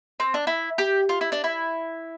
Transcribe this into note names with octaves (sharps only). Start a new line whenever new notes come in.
C4
D4
E4
G4
F4
E4
D4
E4